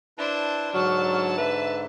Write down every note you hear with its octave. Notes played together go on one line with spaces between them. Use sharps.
D4 E4 B4 C5 A5
G#2 D3 F#3 A5 C#6 F6
B4 E5